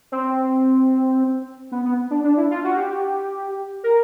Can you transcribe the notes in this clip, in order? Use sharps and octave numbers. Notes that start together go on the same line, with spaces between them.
C4
B3
B3
D4
D4
E4
F4
F#4
G4
A#4